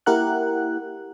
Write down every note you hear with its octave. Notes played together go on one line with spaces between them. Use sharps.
A#3 E4 G4 A#4 F#5 F#6